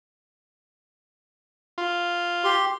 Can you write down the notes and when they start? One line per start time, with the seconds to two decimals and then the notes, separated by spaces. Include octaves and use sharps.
1.78 F4
2.44 G4 C6